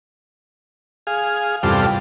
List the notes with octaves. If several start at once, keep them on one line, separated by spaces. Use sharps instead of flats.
G#4 F5
E2 G2 C3 G3 F4 A4